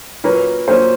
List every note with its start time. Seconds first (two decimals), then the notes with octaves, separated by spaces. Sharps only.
0.24 A#2 F#3 A#3 C#4 B4
0.68 A#2 F#3 A#3 C#4 C5